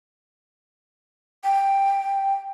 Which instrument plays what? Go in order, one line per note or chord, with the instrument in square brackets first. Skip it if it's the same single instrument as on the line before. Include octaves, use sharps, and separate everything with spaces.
[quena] G5